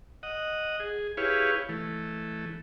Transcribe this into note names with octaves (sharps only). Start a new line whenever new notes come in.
D#5 F#5
G#4
E4 G4 G#4 B4 C#5 F5
E3 A3